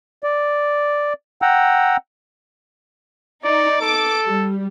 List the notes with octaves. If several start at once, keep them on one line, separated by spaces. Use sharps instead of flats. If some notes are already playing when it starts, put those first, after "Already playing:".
D5
F#5 G5 A#5 E6
D#4 D5
A4 D6
G3